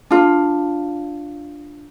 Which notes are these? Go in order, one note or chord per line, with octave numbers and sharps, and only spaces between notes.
D4 F4